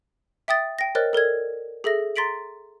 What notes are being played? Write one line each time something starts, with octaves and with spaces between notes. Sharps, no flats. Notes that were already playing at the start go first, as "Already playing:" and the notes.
E5 G5 D#6 A6
G5 A#6
A#4 C5 C#5 D#5 F#6 A6
A4 A#4 D5 G#6
G#4 A4 E5 A#6
A#5 C6 A6 B6 D7 F#7